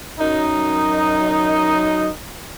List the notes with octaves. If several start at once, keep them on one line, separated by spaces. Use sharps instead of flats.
F#2 D#4